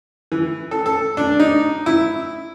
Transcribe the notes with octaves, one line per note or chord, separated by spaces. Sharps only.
E3
A4
A4
D4
D#4
E4